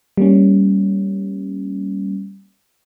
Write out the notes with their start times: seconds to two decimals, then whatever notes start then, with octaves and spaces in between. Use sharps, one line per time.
0.17 G3 A#3 C#4